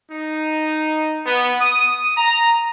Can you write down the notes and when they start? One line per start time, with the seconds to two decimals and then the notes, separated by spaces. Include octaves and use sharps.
0.11 D#4
1.26 B3
1.61 D#6
2.17 A#5